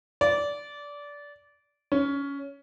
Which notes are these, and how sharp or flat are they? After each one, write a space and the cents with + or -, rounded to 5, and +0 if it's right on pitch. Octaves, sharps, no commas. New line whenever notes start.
D5 -20
C#4 +15